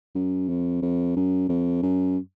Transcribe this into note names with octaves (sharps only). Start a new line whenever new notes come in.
F#2
F2
F2
F#2
F2
F#2